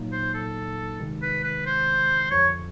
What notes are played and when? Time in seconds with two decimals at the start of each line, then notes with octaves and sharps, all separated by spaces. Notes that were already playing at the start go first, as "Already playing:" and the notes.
Already playing: A#2 F#3 A#3 D#4
0.12 C5
0.34 A4
0.99 C3 D#3 G#3
1.22 B4
1.44 B4
1.66 C5
2.31 F2 D3 F3 C#5